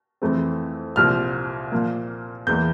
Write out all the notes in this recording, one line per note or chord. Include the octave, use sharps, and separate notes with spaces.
F2 E3 A3 C4
C2 A#2 F3 C4 F6
A#2 F3 A#3
E2 E3 A#3 G6